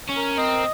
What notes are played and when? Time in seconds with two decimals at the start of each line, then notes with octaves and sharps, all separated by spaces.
0.09 C#4
0.16 A#4
0.37 C4 D#5